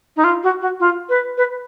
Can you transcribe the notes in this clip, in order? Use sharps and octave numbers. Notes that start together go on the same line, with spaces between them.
D#4
F4
F#4
F#4
F4
B4
B4